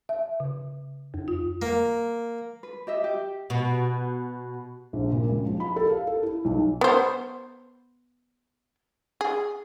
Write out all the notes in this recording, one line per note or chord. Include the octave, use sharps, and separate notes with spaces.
E5
C#3
F2
F4
A#3
B4
G4 D#5 E5
G4
B2
A#1
A#2
C#2
F3
B5
A4
F5
A4
E4
B1
B3 C5
G#4